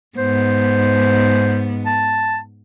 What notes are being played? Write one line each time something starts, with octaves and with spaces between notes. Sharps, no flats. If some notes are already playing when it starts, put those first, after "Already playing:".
G#2 B3 C5
A5